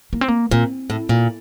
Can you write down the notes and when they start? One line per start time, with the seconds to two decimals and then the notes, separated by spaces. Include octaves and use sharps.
0.13 A#3
0.21 C4
0.28 A#3
0.51 A#2 C4
0.90 A2
1.09 A#2